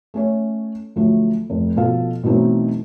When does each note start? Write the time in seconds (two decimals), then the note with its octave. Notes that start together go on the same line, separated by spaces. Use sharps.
0.14 A3 C#4 C#5
0.96 D2 F3 F#3 A3
1.50 F1
1.76 B2 F3 A4 F5
2.24 B2 E3 F#3 A3 C4 D#4